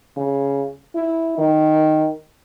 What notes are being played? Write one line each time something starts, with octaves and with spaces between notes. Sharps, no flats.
C#3
E4
D#3